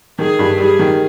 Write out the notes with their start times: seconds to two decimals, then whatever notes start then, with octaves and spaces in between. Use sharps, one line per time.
0.19 D#3 G#4
0.39 G2
0.59 G3 G#4
0.79 D#3